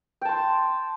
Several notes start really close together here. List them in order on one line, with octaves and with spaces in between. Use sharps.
G5 A5 C6